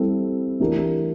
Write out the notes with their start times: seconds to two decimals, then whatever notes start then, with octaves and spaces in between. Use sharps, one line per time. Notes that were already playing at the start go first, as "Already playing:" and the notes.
Already playing: G3 C4 E4 A4
0.60 E3 A3 D4 G4 A#4